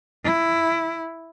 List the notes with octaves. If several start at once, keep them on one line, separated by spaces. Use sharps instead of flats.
E4